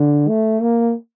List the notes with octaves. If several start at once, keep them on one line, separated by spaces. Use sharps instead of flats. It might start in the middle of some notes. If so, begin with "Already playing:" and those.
Already playing: D3
A3
A#3